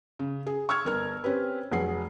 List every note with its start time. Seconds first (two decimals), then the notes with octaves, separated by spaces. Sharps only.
0.19 C#3
0.46 G#4
0.69 C#6 E6 F6 G#6
0.85 G1 A#4 F6
1.24 C4 C#4 G4 B4
1.72 F1 F#3 G#4 F#5 C7